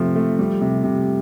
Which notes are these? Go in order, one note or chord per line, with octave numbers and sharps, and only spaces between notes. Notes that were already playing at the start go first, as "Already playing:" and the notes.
Already playing: C3 F3 A3
A3
G3
C3
C3